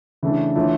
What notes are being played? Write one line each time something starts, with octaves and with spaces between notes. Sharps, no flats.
C#3 E3 A3 D4
E3 A3 D4 F4 C#5